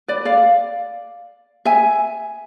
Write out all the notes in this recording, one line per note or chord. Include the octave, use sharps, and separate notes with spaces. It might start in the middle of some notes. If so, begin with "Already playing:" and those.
B4 D5
D5 F5
E5 G#5